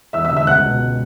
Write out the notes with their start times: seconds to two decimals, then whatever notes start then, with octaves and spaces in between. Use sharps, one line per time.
0.13 E2 E5 E6
0.25 E5 E6
0.31 D3
0.37 E5 E6
0.47 C#2 F#5 F#6
0.65 B2